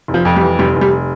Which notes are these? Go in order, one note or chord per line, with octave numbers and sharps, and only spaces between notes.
F1
F3
F2
G3
E3
F1 G3
F1
G3